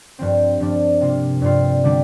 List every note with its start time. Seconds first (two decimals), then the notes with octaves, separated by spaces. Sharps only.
0.19 G2 F3 C4
0.60 G2 F3 D4
1.01 C3 A#3 F4
1.42 G2 G3 C4 F4
1.84 D3 G3 D4